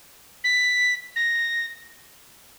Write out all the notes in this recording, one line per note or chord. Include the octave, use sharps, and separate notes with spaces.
B6
A#6